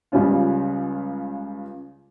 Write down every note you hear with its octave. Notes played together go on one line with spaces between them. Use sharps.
C#2 C#3 G3 C#4 F4